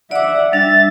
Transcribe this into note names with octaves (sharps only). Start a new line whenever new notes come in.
D5 E5 F#5 D6
G3 D4 E5 A6